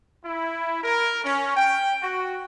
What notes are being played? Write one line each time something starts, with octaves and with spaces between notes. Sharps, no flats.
E4
A#4
C#4
G5
F#4